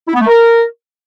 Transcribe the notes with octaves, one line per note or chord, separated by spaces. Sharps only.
E4
B3
A3
A#4